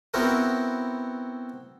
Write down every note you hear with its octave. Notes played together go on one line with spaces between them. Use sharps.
B3 C4 E4 F#4 A#4